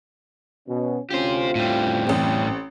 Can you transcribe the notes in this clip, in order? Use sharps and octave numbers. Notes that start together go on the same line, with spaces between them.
B2 C#4
D2 C4 C#4 F4 G4 C5
A2 G3 C#4 G5
A1 C4